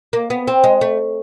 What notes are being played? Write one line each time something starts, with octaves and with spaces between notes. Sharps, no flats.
A#3
B3
C4
G#3
A3